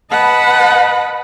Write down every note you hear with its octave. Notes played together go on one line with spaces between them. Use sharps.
B4 D#5 F#5 A5 B5